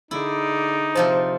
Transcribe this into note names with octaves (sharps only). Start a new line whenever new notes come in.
D3 D#4 E4 G#4 D5
C3 F3 C5 A5